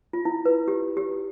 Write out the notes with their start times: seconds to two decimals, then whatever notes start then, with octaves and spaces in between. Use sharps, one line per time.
0.13 F4
0.25 E4
0.45 B4
0.68 G4
0.97 G4